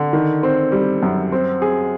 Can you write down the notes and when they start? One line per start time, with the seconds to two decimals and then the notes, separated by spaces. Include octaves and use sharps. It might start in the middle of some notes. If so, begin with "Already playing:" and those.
Already playing: D3
0.13 D#3
0.43 C4
0.72 G3
1.03 F#2
1.32 C4
1.62 G#4